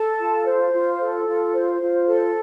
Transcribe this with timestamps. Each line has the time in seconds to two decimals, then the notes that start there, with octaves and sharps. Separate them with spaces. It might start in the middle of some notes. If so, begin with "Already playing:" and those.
Already playing: A4 A5
0.19 F4
0.46 C5
0.73 F4
1.00 A4
1.27 F4
1.54 C5
1.82 F4
2.08 A4